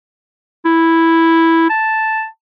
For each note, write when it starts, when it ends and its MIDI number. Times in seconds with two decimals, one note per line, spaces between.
0.66 1.66 64
1.70 2.26 81